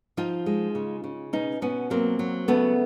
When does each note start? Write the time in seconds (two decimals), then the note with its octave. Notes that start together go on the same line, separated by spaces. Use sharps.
0.17 F3 D#4 F4
0.46 G#3
0.75 C#3
1.04 C#3
1.33 B2 C#4 D#4
1.62 B2 B3 C#4
1.90 F#3 A#3 C4
2.19 F#3
2.48 C#3 A3 B3